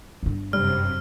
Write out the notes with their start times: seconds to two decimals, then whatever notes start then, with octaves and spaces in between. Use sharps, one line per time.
0.23 G1 G2
0.53 F#2 C3 G3 F6